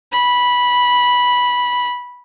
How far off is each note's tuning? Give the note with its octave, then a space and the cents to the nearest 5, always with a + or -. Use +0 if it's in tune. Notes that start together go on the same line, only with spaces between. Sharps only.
B5 -10